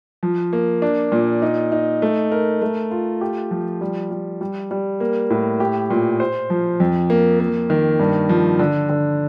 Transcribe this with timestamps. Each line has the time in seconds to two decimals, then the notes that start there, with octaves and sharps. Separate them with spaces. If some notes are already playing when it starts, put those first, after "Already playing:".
0.23 F3
0.53 A#3
0.82 D4
1.12 A#2
1.42 D#4
1.72 D#4
2.02 A3
2.31 A#4
2.62 A3
2.91 F4
3.21 G4
3.51 F3
3.81 G3
4.11 G3
4.41 G3
4.71 G3
5.00 A#3
5.30 A2
5.60 G4
5.90 A#2
6.20 C5
6.50 F3
6.80 F2
7.10 A#3
7.40 A#3
7.70 D#3
8.00 G2
8.29 F3
8.59 D3
8.89 D3